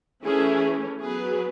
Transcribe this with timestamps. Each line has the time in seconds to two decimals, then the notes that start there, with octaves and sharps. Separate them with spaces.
0.24 E3 A3 C#4 E4 G#4
1.01 F#3 B3 G#4 B4